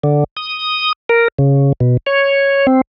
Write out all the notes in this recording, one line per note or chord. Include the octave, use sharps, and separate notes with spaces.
D3
D#6
A#4
C#3
B2
C#5
C4